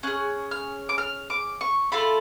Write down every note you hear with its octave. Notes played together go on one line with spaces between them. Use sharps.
C#4 G#4 F#6
F6
D6
F6
D6
C#6
A3 F4 A4 B5